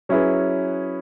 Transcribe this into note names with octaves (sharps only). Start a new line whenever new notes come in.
F#3 C#4 E4 G#4 B4